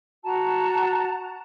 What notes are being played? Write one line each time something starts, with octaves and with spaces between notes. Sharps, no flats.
F#4 A5 A#5